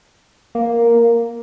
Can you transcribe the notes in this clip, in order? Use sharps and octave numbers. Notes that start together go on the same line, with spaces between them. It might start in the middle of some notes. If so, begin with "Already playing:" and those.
A#3